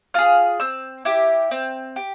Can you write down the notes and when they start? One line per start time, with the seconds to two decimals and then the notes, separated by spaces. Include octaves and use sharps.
0.14 F4 G#4 F6
0.60 C4 E6
1.05 E4 G4
1.51 C4
1.96 G4